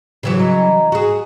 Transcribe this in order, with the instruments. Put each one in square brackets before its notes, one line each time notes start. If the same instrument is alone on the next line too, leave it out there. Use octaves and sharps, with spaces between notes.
[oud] C#3 E3 F#3
[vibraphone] D#5 A#5
[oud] F#4 G#4